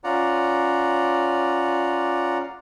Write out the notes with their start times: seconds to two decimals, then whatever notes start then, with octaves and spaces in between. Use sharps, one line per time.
0.04 C#4 F4 D5 F#5 A#5